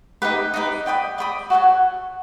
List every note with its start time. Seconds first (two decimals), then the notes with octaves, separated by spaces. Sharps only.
0.22 D#4 G4 B4
0.54 D#4 G4 B4
0.86 D5 G5 B5 D#6
1.18 D5 G5 B5 D#6
1.50 F#4 A4 C#5 F#5